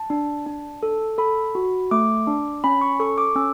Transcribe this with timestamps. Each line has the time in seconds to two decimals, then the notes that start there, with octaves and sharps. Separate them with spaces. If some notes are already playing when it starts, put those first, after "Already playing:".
Already playing: A5
0.10 D4
0.46 D4
0.83 A4
1.18 A4 B5
1.55 F#4
1.91 A3 D6
2.27 D4
2.64 C#4 B5
2.81 C#6
3.00 A4 C#6
3.18 D6
3.36 C#4 E6